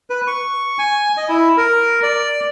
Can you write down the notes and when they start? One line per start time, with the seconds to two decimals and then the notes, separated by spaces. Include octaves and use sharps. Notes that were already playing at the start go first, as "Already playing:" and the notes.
0.10 B4
0.27 C#6
0.78 G#5
1.17 D#5
1.29 E4
1.57 A#4
2.03 D5